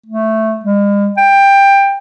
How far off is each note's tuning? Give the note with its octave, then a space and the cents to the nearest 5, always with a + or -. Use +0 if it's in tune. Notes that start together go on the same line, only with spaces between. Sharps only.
A3 +0
G#3 -45
G5 +15